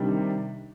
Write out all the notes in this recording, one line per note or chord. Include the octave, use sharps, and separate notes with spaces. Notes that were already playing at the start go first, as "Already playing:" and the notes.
Already playing: C3 D#3 G3 D4